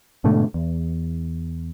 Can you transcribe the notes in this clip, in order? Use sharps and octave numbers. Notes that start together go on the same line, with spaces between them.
G#2 B2 D3 A3
E2